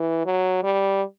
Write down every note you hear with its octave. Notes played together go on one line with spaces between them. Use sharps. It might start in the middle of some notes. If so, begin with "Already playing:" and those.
Already playing: E3
F#3
G3